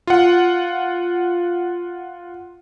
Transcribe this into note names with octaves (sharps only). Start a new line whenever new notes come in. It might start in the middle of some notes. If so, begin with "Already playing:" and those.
F4 F#5